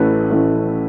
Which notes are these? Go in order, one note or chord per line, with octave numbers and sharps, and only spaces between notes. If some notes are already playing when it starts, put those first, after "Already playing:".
Already playing: A1 A2 A3 C#4 B4
A1 A2 A3 C#4